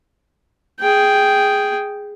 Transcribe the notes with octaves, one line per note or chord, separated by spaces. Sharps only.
G#4 G5